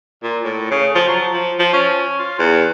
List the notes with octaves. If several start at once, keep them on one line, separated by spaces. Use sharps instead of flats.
A#2
A2
C#3
F3
F#3
F3
F3
C#4
F4
E2